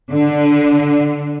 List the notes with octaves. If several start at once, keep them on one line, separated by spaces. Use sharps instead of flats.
D3